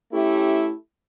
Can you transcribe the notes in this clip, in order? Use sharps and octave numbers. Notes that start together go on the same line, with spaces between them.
A3 C#4 E4 G4